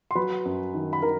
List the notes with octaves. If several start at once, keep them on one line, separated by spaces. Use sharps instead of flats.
C6
F#3 B4 B5
F#2
D#3
B5
D#3 A#4 A#5